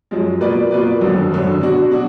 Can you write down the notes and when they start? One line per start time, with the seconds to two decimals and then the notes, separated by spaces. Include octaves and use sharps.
0.11 F#2 F3 G#3
0.41 B2 A#3 F4 B4 D5
0.71 B2 A#3 F4 B4 D5
1.01 G#1 F#2 D3
1.31 G#1 F#2 D3
1.61 B2 F#3 D4 F#4
1.91 B2 F#3 D4 F#4